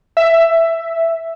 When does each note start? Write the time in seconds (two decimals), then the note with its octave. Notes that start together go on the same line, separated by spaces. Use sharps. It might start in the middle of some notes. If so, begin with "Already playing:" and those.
0.17 E5